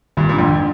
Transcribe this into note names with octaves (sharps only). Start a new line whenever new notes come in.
G2 A#2 D#3
A#2 D4
F2 G#2
D#3